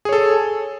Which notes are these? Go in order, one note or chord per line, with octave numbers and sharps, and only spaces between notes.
G#4 A4 C#5